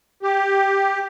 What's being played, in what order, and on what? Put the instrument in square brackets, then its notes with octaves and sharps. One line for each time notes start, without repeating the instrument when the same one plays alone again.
[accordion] G4